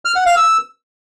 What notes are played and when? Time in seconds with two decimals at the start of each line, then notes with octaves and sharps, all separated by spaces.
0.05 F6
0.16 F#5
0.26 F5
0.37 E6